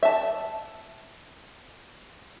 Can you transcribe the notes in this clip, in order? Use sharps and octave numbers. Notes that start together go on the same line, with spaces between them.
E5 A5